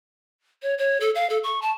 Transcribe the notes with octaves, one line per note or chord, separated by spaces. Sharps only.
C#5
C#5
A4
F5
A4
C#6
A5